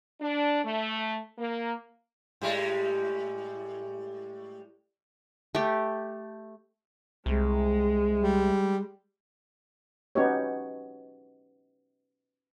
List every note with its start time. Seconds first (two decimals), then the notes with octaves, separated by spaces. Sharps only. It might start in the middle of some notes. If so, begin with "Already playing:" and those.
0.20 D4
0.64 A3
1.39 A#3
2.42 A2 G3 G#3
5.55 A3 G4
7.26 C2 G#3
8.20 G3
10.15 B3 C#4 D#4 F#4 G4 C#5